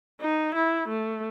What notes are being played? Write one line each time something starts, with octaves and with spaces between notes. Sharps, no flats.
D#4
E4
A3